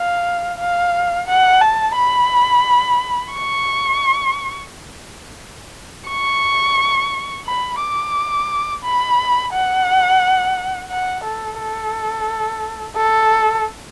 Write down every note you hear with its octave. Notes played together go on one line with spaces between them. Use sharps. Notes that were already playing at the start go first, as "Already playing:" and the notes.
Already playing: F5
F5
F#5
A5
B5
C#6
C#6
B5
D6
B5
F#5
F#5
A4
A4
A4